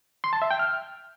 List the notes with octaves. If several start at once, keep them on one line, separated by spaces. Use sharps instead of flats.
C6
A5
E5
G5
F6